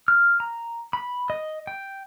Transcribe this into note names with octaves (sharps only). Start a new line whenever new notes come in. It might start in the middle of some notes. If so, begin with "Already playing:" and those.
F6
A#5
B5
D#5
G5